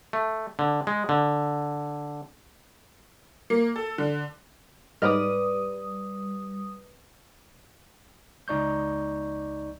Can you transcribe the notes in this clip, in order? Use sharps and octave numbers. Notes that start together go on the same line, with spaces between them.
A3
D3
G#3
D3
A#3
A4
D3
G#2 G3 B4 D5 D#5 D#6 F6
C#2 D#4 D5 C#6 G6